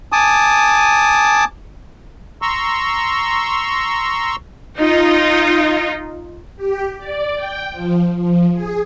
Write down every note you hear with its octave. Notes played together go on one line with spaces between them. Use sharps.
G#5 A5 D6 D#6
A#5 C6 C#6 E6
D#4 F4
G4
D5
G5
F3
F3
G#4